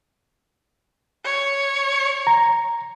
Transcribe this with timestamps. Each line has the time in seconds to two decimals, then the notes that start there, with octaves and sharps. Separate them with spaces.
1.24 C#5
2.27 A#5